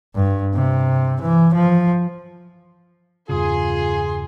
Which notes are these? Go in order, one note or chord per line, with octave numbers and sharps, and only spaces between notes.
G2
C3
E3
F3
E2 G2 C#3 F4 G#4 G#5 C6